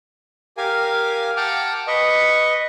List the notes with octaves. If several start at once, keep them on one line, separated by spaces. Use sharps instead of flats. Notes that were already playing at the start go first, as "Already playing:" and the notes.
G4 A#4 F5 G#5
F#5 G5 A5 D6 F6
B4 D#5 C#6